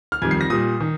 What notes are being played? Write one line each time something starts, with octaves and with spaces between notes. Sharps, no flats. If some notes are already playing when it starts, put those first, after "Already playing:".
F6
F2 D#3 G3 G#6
C7
A#6
A#2 G3 D#6
D#3